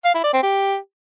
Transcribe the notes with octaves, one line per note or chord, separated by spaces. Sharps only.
F5
E4
D5
C4
G4